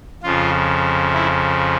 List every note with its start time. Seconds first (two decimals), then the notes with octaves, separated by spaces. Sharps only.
0.23 F2 C#3 F3 F4
1.13 E4